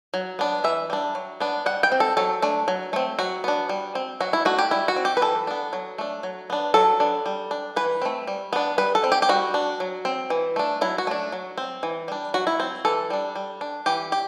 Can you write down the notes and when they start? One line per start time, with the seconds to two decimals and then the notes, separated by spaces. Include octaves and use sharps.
0.14 F#3
0.39 B3 D4
0.64 E3 E5
0.90 G3 D4
1.15 F#3
1.40 B3 D4
1.66 G3 F#5
1.83 G5
1.92 C4
2.00 A4
2.17 F#3 A4
2.42 A3 D4
2.68 F#3
2.93 A3 C4
3.19 F#3 F#4
3.44 B3 D4
3.69 G3
3.95 C4
4.20 F#3 F#4
4.33 E4
4.45 A3 D4 F#4
4.58 G4
4.71 G3 E4
4.88 F#4
4.96 C4
5.05 G4
5.17 B4
5.22 E3 A4
5.47 B3 D4
5.73 F#3
5.98 A3 D4
6.23 F#3
6.50 B3 D4
6.74 F#3 A4
7.00 B3 D4
7.26 G3
7.51 D4
7.76 E3 B4
8.02 A3 C4
8.27 G3
8.53 B3 D4
8.78 G3 B4
8.95 A4
9.04 C4
9.12 G4
9.22 G4
9.29 G3 F#4
9.54 D4
9.80 F#3
10.05 C4
10.30 E3
10.56 A3 D4
10.81 F#3 E4
10.98 F#4
11.07 A3 D4
11.32 F#3
11.58 C4
11.83 E3
12.08 G3 D4
12.34 F#3 F#4
12.47 E4
12.60 C4
12.85 E3 A4
13.10 G3 D4
13.36 G3
13.61 D4
13.86 E3 G4
14.12 G4